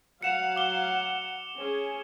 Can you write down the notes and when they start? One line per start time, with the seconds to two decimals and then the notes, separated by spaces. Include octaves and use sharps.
0.23 F#3 F5 F#5 C#7 E7 F7
0.56 D6 G7
1.57 C#4 G#4